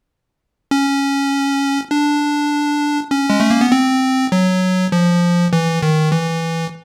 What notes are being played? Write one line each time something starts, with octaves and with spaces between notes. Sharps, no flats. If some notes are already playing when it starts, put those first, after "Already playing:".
C#4
D4
C#4
G#3
A3
A#3
B3
C4
F#3
F3
E3
D#3
E3